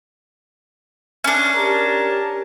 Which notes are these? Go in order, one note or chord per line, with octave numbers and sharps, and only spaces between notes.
C#4 D4
G4 A#4 A5